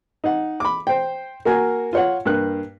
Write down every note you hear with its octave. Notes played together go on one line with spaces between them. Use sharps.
D#4 F#5
B5 D6
C5 G5
A#3 F#4 A#4 G#5
F4 C#5 F#5
G2 A#3 F#6